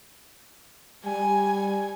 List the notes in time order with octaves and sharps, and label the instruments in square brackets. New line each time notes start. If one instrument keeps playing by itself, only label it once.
[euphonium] G3 [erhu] G#5